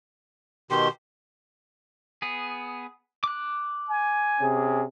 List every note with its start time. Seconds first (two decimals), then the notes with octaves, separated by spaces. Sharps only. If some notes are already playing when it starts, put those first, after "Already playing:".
0.71 B2 D#3 G4 C6
2.22 B3 G#4
3.24 D6 F#6
3.89 G#5
4.40 C3 C#4 G#4